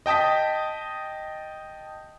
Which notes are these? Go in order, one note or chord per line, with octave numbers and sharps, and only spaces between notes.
D#5 G5 A5 D#6 B6